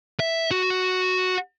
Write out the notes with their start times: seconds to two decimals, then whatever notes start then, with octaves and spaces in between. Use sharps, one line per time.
0.20 E5
0.51 F#4